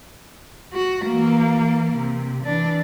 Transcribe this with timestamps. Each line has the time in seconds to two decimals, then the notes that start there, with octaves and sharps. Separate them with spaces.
0.73 F#4
1.06 E3 A#3
1.96 C3
2.45 E3 D4